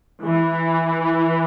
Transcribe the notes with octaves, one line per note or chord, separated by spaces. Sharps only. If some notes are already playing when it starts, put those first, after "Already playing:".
E3